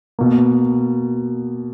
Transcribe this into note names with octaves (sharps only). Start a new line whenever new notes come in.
B2 A#3